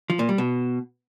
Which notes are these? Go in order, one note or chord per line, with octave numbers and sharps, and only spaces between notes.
F3
A#2
G3
B2